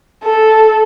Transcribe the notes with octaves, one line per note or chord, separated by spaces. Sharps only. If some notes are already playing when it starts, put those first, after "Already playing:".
A4